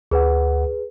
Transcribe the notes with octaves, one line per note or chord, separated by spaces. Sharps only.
D2 G#4 B4 F#5